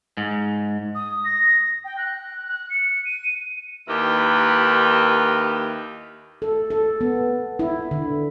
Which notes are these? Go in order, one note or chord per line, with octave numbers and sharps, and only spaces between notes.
G#2
D#6
A#6
G5
F#6
F#6
C#7
D#7
D#2 D#4 E4 G4 A#4 B4
A4
A4
B3
E4
D3